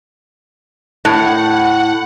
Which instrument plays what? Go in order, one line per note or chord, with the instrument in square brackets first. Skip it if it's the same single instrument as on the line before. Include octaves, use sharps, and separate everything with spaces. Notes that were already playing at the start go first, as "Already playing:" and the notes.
[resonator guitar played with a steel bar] A2 [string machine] F#5